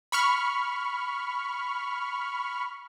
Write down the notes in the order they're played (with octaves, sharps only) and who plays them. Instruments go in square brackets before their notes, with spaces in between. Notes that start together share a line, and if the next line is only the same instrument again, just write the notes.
[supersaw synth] B5 C#6 F6